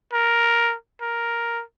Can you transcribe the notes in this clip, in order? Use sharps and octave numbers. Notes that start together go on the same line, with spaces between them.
A#4
A#4